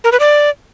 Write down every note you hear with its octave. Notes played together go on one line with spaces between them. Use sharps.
A#4
B4
D5